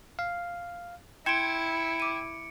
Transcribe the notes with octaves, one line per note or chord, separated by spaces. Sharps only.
F5
E4 G5 B5 C6 G#6 C#7 D7 E7
D6 D#7